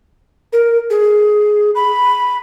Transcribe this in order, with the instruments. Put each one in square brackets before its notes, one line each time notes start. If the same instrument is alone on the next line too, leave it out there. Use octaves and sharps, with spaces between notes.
[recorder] A#4
G#4
B5